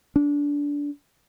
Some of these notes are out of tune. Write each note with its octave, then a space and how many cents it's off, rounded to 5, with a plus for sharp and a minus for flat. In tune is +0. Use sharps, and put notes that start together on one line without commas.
D4 -20